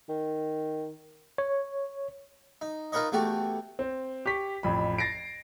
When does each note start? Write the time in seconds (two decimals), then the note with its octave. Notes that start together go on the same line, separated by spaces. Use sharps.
0.09 D#3
1.38 C#5
2.61 D#4
2.92 D#4 F4 A#4 B4 C#5 D#5
3.12 E2 A3 F#4 G4
3.79 C4
4.26 G4 C#6 B6
4.63 A1 F2 B5
4.98 A6 A#6 C7 D7